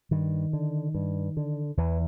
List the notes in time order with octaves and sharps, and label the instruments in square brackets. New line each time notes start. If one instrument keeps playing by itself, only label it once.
[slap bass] G2 D#3
D3
G2
D3
E2 E3